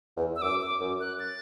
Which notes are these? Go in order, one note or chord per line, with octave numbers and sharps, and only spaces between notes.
E2
E6
F#2 D6
D6
F#2
F#6
A6